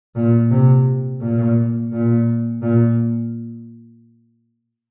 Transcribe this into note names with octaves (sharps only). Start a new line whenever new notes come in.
A#2
C3
A#2
A#2
A#2